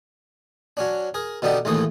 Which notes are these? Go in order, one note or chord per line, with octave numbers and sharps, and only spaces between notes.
F#3 C#4 D4
G#4 A#4
B2 D3 B3 D4 D#4 G4
A#1 D#2 A2 E3 A3 D#6